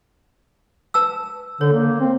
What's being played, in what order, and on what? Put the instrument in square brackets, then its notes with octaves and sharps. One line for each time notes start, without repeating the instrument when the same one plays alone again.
[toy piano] B4 A5 E6
[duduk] D3 [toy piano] C#5
[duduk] A#3
C4